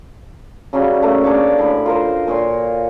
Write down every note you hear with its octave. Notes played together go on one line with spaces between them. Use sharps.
C#3 F#3 G3 C#4
A3 A#3
D4 G#4 C#5 D5
A2 D3 C#4 B5
F4 A#4 C5
A#2 C#5 C6